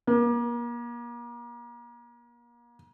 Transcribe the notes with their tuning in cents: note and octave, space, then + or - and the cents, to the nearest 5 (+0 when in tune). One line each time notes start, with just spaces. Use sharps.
A#3 +35